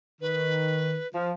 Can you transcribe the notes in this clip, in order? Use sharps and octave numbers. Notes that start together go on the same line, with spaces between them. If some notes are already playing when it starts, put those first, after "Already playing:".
D#3 B4
F3